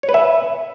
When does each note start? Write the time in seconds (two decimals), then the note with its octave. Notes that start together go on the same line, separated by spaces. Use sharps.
0.03 C#5
0.09 B4
0.14 E5